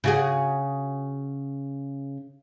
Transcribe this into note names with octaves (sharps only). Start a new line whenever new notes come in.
C#3 F#4 G#4